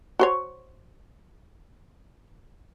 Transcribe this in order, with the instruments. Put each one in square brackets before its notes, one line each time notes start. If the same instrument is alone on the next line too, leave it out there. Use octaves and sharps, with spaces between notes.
[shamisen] F#4 C5 C#5